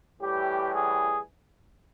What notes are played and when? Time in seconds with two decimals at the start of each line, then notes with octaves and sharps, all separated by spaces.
0.21 A2 E3 G3 G4
0.72 G#4